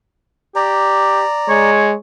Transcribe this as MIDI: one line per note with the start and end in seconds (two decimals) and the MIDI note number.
0.56 1.22 67
0.56 1.71 74
0.56 1.71 82
1.49 1.94 56
1.49 1.93 73